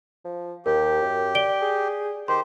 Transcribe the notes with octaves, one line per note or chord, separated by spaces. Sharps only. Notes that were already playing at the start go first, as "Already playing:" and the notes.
F3
D#2 G4 A#4
F#2
D5 D7 G7
G#4
D#3 G4 C5 C6